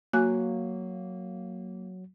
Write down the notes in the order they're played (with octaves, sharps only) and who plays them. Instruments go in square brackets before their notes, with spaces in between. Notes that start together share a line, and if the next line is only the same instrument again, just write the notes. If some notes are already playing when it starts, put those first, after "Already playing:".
[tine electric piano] F#3 [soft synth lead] A#3 [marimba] F#4 G#5 F#6